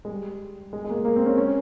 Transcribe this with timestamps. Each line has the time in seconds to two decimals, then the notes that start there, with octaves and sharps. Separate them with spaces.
0.05 G#3
0.09 G3
0.73 G#3
0.84 G#3
0.90 A#3
0.95 G#3
1.05 A#3
1.16 C4
1.26 C#4
1.38 C#4